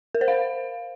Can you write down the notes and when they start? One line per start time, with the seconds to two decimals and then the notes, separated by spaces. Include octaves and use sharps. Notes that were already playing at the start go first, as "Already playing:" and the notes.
0.15 A#4
0.21 C5
0.28 F5